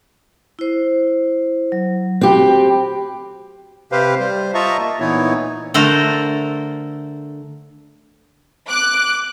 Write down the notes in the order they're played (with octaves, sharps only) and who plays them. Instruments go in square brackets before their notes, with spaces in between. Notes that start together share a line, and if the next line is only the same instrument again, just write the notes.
[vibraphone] E4 C5
F#3
[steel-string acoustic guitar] C4 G4 [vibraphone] F#4 B5
[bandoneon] C3 G4 B4 C5 F5
G3 C5
F4 D#5 E5 A5 A#5 C#6
A#3
A#2 E3 B3 D#4 E4 C#5
[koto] D3 A3 A#4 C5
[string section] D6 F#6